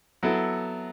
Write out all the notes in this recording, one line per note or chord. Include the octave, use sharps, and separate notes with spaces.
F#3 B3 E4 A4